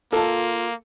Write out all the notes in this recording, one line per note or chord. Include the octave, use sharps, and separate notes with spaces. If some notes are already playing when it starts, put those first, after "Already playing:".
A#3 F4 A4 A5